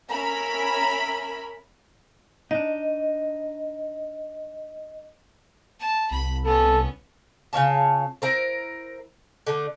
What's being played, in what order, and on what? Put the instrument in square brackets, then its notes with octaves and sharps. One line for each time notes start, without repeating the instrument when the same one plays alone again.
[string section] C#4 A#4 E5 B5
[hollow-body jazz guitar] D4 D#4 [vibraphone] D#5
[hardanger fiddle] A5
[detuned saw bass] C2 [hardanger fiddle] B5
[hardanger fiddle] B3 C#4 [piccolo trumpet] A4
[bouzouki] C#3 F4 C#5 A5
E4 A#4 C5
D3 A3